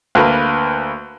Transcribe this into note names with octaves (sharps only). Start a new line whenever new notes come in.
D2 A#3 A#4 B4